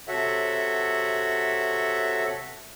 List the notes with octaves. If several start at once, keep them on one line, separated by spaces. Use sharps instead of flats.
C3 F#4 A4 C#5 E5 F#5